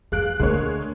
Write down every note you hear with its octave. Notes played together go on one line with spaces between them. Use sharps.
F2 G#4 F5 F#6 D7
D2 D3 G#3 A#3 C#5